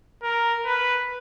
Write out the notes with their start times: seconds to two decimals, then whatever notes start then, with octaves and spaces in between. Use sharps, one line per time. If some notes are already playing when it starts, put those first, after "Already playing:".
0.23 A#4
0.66 B4